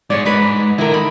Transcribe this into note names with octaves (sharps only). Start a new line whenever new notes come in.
G#2 G#3 C#5 D5
G#2 D4 B4
D3 D#3 E4 A#4
B5